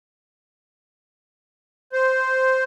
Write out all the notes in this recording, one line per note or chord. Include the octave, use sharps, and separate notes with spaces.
C5